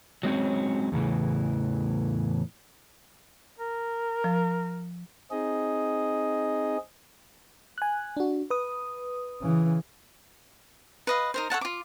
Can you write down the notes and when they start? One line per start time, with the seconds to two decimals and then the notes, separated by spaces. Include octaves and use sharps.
0.23 F#3 G#3 C4 C#4
0.92 E2 A2 C#3 E3
3.59 A#4
4.24 F3
5.31 C4 D#4 G#4 D#5
7.78 G#5 F#6
8.17 D4 F#4
8.50 B4 D#6
9.42 C#3 E3
11.07 B4 D#5 F5
11.34 D#4 A#4 C5
11.50 A4 C#5 F#5 A5
11.61 F4 D6